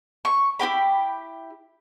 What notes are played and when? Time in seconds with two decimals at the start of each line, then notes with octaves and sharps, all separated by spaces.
0.25 C#6
0.59 E4 G4 G5 B5